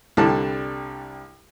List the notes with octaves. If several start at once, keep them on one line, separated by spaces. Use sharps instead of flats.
C2 D3 G3 A5